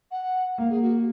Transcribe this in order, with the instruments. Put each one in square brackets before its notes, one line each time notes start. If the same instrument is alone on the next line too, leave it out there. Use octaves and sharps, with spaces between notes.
[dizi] F#5
[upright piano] A#3 [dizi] F5
[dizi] G#4
F#4